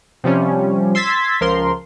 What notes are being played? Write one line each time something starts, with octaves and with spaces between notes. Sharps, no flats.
C3 F3 G3 C#4
C6 E6 G#6 A6 B6
C#2 F3 A#4 C6